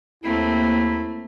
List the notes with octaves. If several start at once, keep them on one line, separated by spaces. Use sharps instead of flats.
D#2 A3 A#3 C4 E4